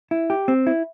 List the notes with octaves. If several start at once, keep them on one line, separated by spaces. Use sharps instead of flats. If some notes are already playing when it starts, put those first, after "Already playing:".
E4
G4
C4
E4